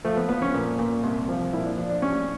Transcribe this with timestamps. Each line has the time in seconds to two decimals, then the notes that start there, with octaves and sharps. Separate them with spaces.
0.04 F3 A3
0.17 B3
0.29 F3 B3
0.42 C#4
0.54 A#2
0.79 A#2
1.03 C2
1.28 F3
1.53 A#2 E4
1.66 D4
1.78 F3 D4
1.89 D4
2.02 A1 C#4